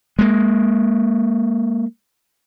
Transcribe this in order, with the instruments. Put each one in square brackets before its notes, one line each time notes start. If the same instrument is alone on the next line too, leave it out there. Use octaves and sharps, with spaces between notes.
[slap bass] G#3 A#3